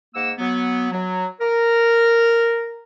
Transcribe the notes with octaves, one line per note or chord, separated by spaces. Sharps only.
G#2 A#3 F#5 E6
F#3 B3
F#3
A#4